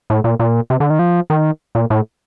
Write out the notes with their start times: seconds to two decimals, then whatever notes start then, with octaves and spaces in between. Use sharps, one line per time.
0.10 A2
0.24 A#2
0.39 A#2
0.70 C3
0.80 D3
0.90 D#3
0.99 F3
1.30 D#3
1.75 A#2
1.90 A2